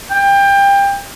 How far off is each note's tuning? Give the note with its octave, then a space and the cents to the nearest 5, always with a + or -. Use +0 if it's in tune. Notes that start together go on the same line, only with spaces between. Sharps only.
G5 +25